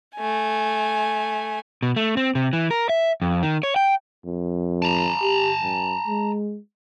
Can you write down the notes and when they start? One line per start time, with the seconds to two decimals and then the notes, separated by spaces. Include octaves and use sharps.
0.16 A3 G#5
1.83 B2
1.96 A3
2.17 C4
2.35 C3
2.53 E3
2.71 A#4
2.89 E5
3.22 F2
3.43 D#3
3.63 C#5
3.76 G5
4.25 F2
4.82 A5 A#5
5.22 G4
5.60 F#2
6.07 G#3